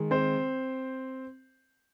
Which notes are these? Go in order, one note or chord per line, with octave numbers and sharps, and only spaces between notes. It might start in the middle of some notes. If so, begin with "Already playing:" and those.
Already playing: D#3 G#3
C4 C5